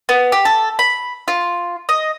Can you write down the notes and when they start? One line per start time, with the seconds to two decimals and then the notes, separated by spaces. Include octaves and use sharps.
0.09 B3
0.32 G4
0.45 A4
0.79 B5
1.28 F4
1.89 D#5